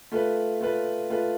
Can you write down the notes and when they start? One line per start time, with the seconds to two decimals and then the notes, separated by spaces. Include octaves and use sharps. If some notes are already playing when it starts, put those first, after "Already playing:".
0.12 A3 F4 B4
0.61 A3 F4 B4
1.10 A3 F4 B4